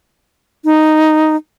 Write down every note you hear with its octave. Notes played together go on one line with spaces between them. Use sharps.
D#4